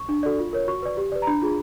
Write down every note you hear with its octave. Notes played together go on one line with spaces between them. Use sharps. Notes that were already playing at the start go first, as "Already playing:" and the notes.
Already playing: C#6
D4
F#4 A4 D5
F4
A#4 C#5
F#4 C#6
B4 D5
G4
B4 D5
A#5
D4 B5
F4 G#4